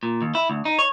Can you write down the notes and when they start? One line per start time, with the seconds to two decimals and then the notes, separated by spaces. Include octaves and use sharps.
0.03 A#2
0.22 D#2
0.35 E4
0.50 D2
0.65 D#4
0.79 C#5